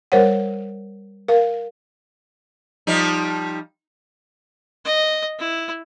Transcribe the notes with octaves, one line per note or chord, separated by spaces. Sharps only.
G3 A#4 C5 C#5 F#5
A#4 F5
F3 G3 D#4
D#5
E4